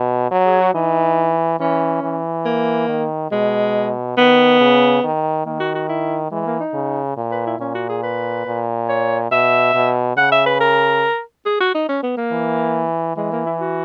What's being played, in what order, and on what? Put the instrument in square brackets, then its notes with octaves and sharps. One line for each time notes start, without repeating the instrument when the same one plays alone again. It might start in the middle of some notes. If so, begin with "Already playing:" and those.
Already playing: [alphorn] B2
F#3
[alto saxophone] G#4
F#4
[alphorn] E3 [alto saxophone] D#4
[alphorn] E3 [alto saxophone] C#4
[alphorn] E3
[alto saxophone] A#3
[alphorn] D#3
[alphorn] B2 [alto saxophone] G#3
[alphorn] D#3 [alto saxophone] B3
[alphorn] C#3
D#3
[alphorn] D#3 [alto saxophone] A#3
[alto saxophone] F#4
F#4
E4
[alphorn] E3 [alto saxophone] G#3
[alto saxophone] A#3
D#4
[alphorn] C#3
A#2
[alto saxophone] B4
E4
[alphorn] A#2 [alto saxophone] C#4
[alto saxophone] F#4
G#4
B4
[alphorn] A#2
[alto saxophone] C#5
[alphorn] B2 [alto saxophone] E5
[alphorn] B2
[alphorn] C#3 [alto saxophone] F#5
[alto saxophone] E5
B4
A#4
G#4
F#4
D#4
C#4
B3
A#3
[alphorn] E3
[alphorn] E3 [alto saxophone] G#3
[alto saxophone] A#3
E4
F#4